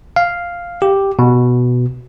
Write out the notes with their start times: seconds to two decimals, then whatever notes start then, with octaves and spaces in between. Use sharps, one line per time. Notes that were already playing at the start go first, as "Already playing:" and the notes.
0.16 F5
0.82 G4
1.19 B2